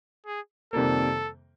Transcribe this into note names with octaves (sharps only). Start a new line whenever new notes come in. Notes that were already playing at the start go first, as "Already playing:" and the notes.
G#4
F2 C3 D#3 G3 A#3 A4